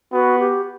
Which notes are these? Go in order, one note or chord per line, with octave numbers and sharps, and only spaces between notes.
B3 F#4
G4